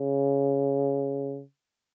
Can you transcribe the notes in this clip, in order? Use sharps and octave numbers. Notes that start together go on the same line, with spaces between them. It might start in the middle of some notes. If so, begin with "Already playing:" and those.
Already playing: C#3